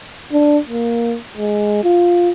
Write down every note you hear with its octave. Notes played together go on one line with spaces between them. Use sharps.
D4
A#3
G#3
F4